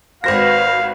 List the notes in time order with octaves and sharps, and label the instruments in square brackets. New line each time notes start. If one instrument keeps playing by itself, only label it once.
[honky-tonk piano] G#1 C5 A#6 [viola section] F#4 B4 [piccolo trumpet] F5